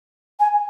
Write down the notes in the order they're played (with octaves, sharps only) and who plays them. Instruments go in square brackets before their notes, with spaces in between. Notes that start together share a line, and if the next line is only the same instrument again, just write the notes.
[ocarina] G#5